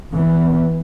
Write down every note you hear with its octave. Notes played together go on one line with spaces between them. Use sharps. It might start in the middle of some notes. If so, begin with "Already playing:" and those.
E3 B3